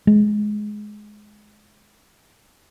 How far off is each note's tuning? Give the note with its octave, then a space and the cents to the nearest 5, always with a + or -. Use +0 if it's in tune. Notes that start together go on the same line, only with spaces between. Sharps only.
G#3 +15